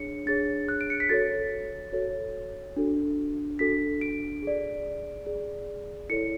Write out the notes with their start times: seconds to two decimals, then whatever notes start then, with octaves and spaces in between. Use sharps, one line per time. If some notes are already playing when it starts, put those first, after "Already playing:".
Already playing: D4 G#4 C#5 C#7
0.26 D4 G#4 C#5 A6
0.68 F#6
0.81 D7
0.90 C#7
1.00 B6
1.09 F#4 A4 C#5 A6
1.93 F#4 A4 C#5
2.76 D4 F#4 A4
3.59 D4 F#4 A4 B6
4.01 D7
4.43 G#4 D5
5.26 G#4 D5
6.09 E4 A4 C#5 C#7